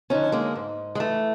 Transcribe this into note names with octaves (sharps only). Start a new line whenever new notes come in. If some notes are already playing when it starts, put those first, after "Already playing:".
D3 F3 C#4 D#4
G#3 A#3
G#2
G#3
E3 A3